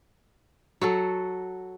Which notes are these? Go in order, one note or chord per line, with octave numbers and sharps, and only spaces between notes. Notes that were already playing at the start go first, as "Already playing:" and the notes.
F#3 F#4 A4